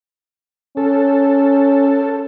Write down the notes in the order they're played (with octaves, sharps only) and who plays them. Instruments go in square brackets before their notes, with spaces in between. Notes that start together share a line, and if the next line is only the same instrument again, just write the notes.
[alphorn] C#4 [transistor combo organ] A4